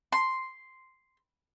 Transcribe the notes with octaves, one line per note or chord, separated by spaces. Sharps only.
C6